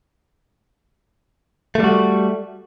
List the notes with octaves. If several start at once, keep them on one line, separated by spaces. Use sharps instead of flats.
G3 A3 F#4